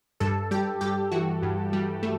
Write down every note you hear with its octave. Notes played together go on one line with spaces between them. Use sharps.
G2 A4
G3 G4
G2 G4
E3 F#4
G2
G3
A3